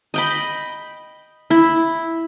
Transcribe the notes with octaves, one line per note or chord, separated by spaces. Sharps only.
D#5 G5 B5
E4